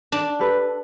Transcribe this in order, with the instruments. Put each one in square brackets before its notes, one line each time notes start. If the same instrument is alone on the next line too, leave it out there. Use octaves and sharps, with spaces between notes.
[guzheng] D4
[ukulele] G4 A4 B4